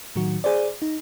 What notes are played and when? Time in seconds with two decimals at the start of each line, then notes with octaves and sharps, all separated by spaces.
0.16 A2 D#3 F#3 F#4
0.44 G#4 C5 D5
0.82 D#4